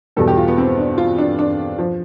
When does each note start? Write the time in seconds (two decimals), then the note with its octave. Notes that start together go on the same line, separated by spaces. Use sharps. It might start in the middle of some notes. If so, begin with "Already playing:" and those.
0.17 E2 B2 G3 A4
0.28 G4
0.37 F4
0.48 B3
0.58 C4
0.77 D4
0.98 F4
1.18 D4
1.39 D4
1.78 F3